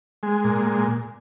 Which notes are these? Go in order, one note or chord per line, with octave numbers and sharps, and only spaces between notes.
G#3
A#2
G#3